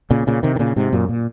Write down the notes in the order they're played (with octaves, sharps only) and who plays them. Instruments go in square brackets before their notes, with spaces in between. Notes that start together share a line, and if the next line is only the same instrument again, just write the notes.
[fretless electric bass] A#2 C#3
A#2 C#3
C3 D#3
D#3
A#2 C#3
G#2 C3
F#2 A#2
A#2